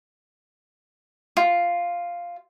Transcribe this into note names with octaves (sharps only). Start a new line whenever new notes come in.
F4